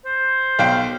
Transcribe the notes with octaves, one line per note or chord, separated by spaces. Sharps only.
C5
B1 F5 G5